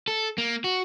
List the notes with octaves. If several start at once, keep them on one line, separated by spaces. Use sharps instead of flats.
A4
A#3
F#4